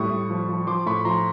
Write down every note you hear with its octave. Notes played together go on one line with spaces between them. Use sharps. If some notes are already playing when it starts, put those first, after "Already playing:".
Already playing: A2 G3 C#6 D#6
A2
F3
F3
F3 C6 D6
A2 B5 C#6
F3 A#5 C6